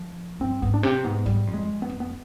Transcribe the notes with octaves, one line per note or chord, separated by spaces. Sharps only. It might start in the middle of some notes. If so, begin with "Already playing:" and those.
Already playing: F3
G2 C4
G#2 B3
D4
C3 C4
G#2 B3
G#2 G3
F2
G#3
B3
F2
B3